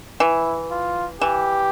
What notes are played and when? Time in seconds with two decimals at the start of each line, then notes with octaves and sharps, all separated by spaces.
0.20 E3 E4
0.71 F4
1.21 E3 G4